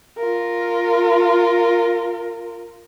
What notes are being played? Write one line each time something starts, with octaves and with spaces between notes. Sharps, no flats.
F4 A#4